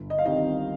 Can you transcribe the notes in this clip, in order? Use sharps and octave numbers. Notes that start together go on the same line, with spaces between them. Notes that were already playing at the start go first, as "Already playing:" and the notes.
Already playing: G1
D#5
F5
D#3 G3 C4 D#5